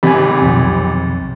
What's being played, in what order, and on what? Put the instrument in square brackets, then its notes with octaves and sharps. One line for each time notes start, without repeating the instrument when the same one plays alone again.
[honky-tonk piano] G#1 C3 [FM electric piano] G#5 B5
[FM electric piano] B1 F2